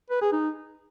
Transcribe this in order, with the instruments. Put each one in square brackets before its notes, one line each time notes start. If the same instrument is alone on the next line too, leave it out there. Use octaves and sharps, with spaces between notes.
[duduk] B4
G#4
D#4